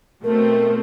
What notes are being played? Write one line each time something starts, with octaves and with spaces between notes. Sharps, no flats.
B2 A3 C4 A#4